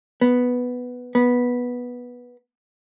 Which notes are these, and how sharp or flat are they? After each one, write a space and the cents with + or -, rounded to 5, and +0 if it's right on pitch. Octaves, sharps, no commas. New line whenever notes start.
B3 +0
B3 -10